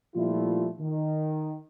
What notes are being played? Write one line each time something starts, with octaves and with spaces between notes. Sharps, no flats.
A#2 F3 G3 A3 E4 F4
D#3